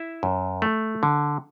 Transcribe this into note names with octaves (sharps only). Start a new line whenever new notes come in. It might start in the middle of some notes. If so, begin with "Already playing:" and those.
Already playing: E4 E5
F#2
A3
D3